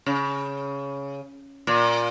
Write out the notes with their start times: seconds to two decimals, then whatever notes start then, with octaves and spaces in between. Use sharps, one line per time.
0.06 C#3
1.67 A#2